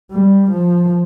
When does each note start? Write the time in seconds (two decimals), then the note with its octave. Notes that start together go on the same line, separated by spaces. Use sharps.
0.11 G3
0.50 F3